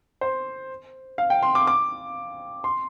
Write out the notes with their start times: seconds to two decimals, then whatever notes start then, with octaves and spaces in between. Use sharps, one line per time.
0.21 C5
1.18 F5
1.30 G5
1.43 C6
1.55 D6
1.67 D6
2.64 C6